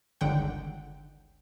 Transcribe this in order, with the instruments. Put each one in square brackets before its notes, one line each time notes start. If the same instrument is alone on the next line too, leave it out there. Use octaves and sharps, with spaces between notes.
[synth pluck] G1 C#2 D3 D#3 F#5 G5